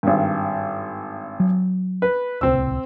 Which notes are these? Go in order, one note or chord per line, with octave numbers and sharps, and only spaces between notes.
G#1 G2
F#3
B4
D1 C2 C4 E6